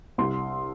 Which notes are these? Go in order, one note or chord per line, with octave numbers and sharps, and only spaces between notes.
C2 C6